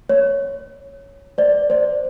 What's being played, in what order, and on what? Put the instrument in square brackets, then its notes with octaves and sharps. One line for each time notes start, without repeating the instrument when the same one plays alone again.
[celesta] C#5
C5 D5
C5 D5